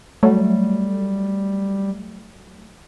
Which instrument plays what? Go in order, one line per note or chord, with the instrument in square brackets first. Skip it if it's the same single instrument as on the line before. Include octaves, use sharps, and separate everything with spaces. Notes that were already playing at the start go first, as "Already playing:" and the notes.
[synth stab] F#3 A3 [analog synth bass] G3